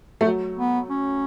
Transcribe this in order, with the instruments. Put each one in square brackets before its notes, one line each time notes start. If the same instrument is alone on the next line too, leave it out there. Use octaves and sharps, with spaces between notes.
[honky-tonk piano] A3
F#3
[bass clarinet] B3
C#4